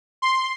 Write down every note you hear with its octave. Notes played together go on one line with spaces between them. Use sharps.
C6